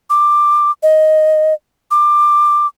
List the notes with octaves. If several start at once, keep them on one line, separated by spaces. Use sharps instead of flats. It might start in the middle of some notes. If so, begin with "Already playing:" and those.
D6
D#5
D6